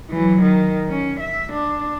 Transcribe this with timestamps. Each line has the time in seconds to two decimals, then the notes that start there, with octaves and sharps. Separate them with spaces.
0.11 E3 F#3
0.42 D#3
0.89 C#4
1.20 E5
1.53 D4